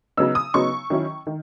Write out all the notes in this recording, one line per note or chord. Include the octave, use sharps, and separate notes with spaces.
C#3 F#3 B3 D#4 E6
D#6
C#3 F#3 B3 D#4 C#6
D#3 F#3 C#4 E4
D#3